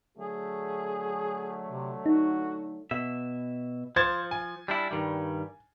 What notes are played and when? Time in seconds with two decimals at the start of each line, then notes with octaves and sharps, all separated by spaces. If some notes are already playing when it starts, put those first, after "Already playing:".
0.18 D3 F#3 A3 G#4
1.69 C3
2.06 D#4 F#4
2.91 B2 E5
3.96 F3 C5 G#6 A6
4.31 G#5
4.68 G3 D4 E4
4.91 G2 D#3 G3